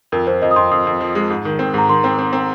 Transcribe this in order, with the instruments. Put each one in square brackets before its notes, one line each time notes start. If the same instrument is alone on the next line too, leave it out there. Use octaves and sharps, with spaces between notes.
[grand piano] F2 [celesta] A#4
[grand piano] F2 [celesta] C5
[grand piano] F2 [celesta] D#5
[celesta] D#6
[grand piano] F2 [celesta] C6
[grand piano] F2 [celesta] D#6
[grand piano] F2
F3
G#3
G#2
D#3
C4
[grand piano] G#2 [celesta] A#5
[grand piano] D#3 [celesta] C6
[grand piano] C4
C4
C4